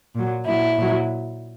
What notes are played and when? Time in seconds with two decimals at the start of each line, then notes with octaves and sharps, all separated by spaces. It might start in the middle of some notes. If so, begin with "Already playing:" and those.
0.14 A#2 F#3
0.46 A#2 F#3 E4
0.77 A#2 F#3